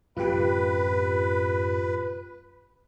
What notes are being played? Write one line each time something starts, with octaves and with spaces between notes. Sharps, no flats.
F#2 A2 C3 F4 G4 B4